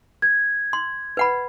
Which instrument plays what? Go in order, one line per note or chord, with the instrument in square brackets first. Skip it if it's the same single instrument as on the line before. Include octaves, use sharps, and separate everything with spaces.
[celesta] G#6
[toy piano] C6
B4 F#5 B5